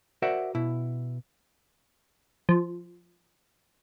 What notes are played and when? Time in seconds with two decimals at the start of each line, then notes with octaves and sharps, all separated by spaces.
0.22 F#4 A#4 C5 D5 E5 F#5
0.55 B2 E4
2.49 F3